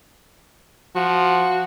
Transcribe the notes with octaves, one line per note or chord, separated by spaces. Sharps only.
F3 F#4